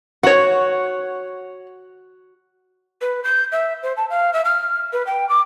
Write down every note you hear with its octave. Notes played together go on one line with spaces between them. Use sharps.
F#4 C#5 F#5
B4
G6
E5
C5
A5
F5
E5
F6
B4
G5
D6